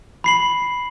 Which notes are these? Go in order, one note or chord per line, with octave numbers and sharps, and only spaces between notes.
B5 C7 F#7